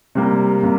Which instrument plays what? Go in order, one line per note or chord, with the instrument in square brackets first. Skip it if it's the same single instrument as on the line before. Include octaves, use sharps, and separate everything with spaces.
[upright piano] C3 G3 A#3
C3 G3 A#3